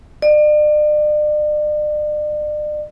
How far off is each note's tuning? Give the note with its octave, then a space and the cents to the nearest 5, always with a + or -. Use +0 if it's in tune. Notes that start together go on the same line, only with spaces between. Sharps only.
D5 +40